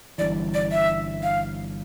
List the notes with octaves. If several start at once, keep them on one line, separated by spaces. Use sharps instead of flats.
G1 G2 E3 D5
D5
E5
F5